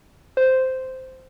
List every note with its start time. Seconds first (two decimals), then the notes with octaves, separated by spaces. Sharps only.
0.37 C5